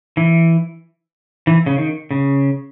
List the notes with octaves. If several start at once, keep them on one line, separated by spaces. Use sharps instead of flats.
E3
E3
C#3
D#3
C#3